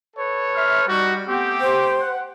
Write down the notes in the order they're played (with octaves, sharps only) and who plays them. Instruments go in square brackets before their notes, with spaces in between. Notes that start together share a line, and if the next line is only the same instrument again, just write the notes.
[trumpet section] A4 B4 C#5
[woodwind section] E5 C6 F6
[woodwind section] G3 [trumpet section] D#4 F#4
[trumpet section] A3 G4 [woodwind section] B3 C4
[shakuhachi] C5
[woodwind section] F#5